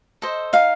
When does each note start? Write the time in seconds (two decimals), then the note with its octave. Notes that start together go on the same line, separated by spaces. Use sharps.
0.22 A4 C5 D#5
0.53 D#4 F5